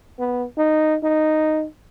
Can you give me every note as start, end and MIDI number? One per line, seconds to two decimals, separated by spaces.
0.19 0.46 59
0.58 0.97 63
1.03 1.67 63